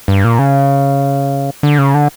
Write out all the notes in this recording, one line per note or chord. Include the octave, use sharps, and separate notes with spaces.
G2
A#2
C#3
D3
C#3
D3